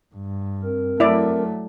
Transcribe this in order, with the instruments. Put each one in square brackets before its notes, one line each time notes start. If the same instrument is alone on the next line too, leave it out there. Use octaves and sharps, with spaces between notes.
[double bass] G2
[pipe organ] C4 A#4
[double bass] F#3 A3 [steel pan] E4 D5